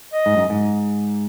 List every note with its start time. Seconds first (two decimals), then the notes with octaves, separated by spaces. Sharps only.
0.13 D#5
0.26 G#2
0.37 F#2
0.50 G#2